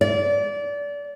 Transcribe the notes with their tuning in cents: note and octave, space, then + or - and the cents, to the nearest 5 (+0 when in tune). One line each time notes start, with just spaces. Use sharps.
D5 -25